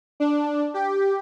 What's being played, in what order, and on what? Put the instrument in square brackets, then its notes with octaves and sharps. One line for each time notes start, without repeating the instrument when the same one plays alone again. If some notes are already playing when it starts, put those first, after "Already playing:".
[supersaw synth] D4
G4